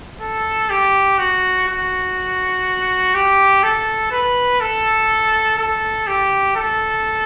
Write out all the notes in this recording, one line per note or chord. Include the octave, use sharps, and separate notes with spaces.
A4
G4
F#4
F#4
G4
A4
B4
A4
A4
G4
A4